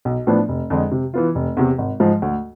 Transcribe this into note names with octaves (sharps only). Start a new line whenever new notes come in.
B1
A2 F3 B3 D4
F1
F2 D3 G#3
C3
E3 B3 F4
F1
E2 C3
G#1
G#2 F3 G#3
D2